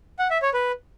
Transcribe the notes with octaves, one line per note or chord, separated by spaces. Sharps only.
F#5
E5
C#5
B4